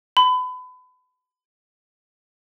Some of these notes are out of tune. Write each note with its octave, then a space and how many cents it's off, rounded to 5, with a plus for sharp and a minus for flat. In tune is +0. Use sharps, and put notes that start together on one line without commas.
B5 +30